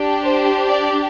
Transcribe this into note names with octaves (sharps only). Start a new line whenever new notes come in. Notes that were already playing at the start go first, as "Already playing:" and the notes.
Already playing: D4 G4
C5
D5